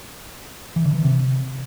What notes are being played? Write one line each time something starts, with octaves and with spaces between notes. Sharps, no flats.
E3
D3
E3
C3